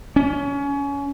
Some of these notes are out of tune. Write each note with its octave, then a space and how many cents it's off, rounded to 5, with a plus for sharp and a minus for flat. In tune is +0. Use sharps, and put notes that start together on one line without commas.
C#4 +25